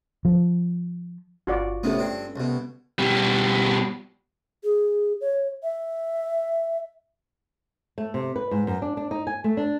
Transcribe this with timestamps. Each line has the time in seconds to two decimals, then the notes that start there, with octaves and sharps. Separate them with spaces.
0.25 F3
1.47 G1 F4 F#4 D5
1.83 A2 C3 A3 B3 C#4 A4
1.99 G2 C4
2.36 C2 B2
2.99 B2 G3
4.64 G#4
5.21 C#5
5.63 E5
7.98 A3
8.14 C3
8.36 B4
8.51 G#2
8.67 F#2
8.82 D4
8.97 D4
9.11 D#4
9.27 G#5
9.44 A3
9.57 D4